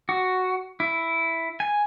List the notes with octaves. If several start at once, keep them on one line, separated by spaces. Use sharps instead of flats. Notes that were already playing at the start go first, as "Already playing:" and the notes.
F#4
E4
G#5